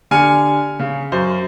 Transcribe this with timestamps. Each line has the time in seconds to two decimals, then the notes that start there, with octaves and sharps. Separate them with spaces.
0.11 D3 G4 G#5 F6 C#7
0.79 C#3
1.12 F#2 C5